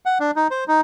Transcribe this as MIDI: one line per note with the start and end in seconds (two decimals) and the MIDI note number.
0.05 0.18 78
0.20 0.31 62
0.36 0.48 63
0.51 0.64 72
0.68 0.81 63